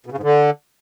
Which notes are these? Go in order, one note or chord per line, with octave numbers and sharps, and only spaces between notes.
B2
C#3
G#2
D3